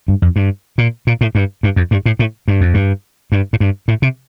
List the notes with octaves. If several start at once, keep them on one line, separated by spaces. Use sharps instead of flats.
G2
F2
G2
A#2
A#2
A2
G2
G2
F2
G2
A2
A2
G2
F2
G2
G2
A2
G2
A2
C3